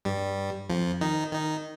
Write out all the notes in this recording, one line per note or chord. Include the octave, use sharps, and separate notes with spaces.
G2 G3
F2 F3
D#3 D#4
D#3 D#4